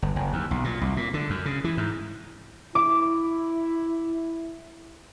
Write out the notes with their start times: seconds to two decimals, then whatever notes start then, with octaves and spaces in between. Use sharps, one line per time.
0.02 G1
0.16 F#1
0.33 D#2
0.51 B1
0.64 A#2
0.81 C2
0.97 A#2
1.14 D3
1.30 F#2
1.46 C#3
1.64 E3
1.77 G#2
2.75 E4 D6